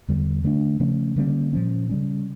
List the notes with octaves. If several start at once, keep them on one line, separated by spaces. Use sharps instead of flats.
E2 D3 G3
D3 A3 D4
C#3 F3 A3 C#4
D3 G3 A#3 C#4
A#2 F3 C#4
C#3 G3 C#4